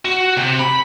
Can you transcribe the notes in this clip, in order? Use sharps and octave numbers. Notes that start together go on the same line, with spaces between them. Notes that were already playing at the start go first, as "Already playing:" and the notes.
F#4
C3
B5